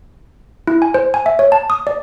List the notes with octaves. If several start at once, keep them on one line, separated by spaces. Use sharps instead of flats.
E4
G#5
C5
G#5
E5
C#5
A5
D#6
D5